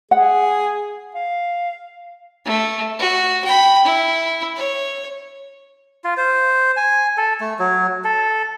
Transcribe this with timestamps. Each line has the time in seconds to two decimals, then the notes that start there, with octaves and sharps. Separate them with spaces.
0.11 G#4 F#5
1.15 F5
2.46 A3
2.99 F#4
3.44 G5 B5
3.85 E4
4.56 C#5
6.04 F4
6.17 C5
6.77 G#5
7.17 A4
7.40 A3
7.59 F#3
8.04 A4